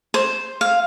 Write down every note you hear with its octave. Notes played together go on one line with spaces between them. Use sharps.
C5
F5